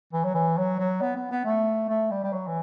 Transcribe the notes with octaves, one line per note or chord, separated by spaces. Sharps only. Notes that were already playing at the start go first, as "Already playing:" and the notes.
E3
F#3
E3
F#3
F#3
B3
B3
B3
A3
A3
G3
G3
F#3
E3